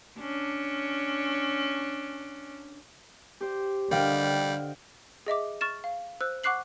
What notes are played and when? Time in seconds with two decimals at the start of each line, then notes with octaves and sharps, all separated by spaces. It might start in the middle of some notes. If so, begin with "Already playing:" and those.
0.19 C#4 D4
3.41 G4 C5
3.91 D3 G3 D#5 F5 G5
5.26 G#4 D#5 E5 D6
5.61 C#6 F6 A6 E7
5.84 F5
6.21 C5 E6 F#6
6.43 F#5 C#6 D6 F#6 C7 F#7